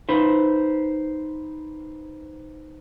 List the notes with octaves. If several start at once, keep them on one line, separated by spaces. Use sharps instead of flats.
D#4 B4 C5